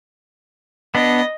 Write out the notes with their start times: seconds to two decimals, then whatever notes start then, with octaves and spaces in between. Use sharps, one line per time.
0.95 B3 D4 D#5